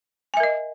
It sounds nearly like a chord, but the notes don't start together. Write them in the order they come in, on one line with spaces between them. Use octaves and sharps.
G#5 E5 A#4 D#5